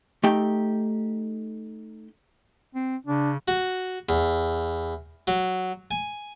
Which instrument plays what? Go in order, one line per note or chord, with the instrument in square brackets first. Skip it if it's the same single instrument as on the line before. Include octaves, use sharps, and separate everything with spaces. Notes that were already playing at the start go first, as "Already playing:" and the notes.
[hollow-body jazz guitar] A3 D#4 G4 G5
[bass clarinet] C4
[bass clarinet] C#3 [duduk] D4
[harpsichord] F#4
E2
F#3
G#5